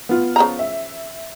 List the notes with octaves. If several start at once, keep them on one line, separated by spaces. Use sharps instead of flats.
B3 F4
C#3 F3 A#5
E5